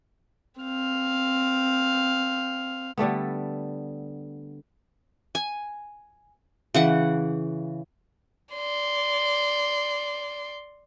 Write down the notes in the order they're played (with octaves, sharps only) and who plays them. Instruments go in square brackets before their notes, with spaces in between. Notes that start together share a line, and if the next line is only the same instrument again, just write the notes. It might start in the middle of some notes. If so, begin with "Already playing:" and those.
[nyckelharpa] C4 F5
[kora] D3 G3 A3 B3
[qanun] G#5
C#3 E3 F#5
[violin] D5 C6